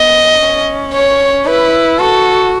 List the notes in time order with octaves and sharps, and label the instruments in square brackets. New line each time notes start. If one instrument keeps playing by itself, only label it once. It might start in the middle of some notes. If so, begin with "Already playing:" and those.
Already playing: [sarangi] B3 [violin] D#5
[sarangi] C#4
[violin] C#5
[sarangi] E4 [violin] B4
[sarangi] F#4 [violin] A4